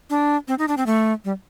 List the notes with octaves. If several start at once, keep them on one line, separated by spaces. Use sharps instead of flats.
D4
C4
D#4
D4
C4
A3
G3